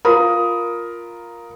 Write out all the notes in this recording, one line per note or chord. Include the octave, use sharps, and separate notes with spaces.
F4 A#4 B5 D#6